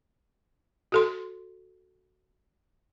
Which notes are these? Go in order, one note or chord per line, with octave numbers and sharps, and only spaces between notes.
F#4 A4 C6